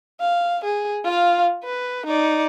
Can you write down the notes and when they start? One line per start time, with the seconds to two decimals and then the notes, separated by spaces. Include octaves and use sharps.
0.21 F5
0.64 G#4
1.05 F4 F5
1.64 B4
2.06 D#4 D5